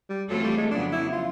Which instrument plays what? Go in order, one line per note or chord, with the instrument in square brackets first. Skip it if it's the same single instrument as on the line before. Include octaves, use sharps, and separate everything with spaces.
[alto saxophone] G3
[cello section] E3 A3 C4 F4 A4 [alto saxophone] F#3
[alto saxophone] G3
G#3
[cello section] F2 C#3 F#3 B3 [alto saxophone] D4
[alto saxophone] E4
F4